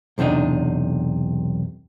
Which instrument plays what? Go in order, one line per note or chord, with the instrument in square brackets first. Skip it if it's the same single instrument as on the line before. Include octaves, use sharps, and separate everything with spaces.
[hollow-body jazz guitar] B1 E2 C3 D4 D#4